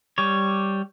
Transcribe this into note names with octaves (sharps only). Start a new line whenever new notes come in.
G3 C#5